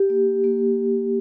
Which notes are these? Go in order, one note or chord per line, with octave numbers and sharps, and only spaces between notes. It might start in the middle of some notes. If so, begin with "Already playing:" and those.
Already playing: G4
A#3
A#3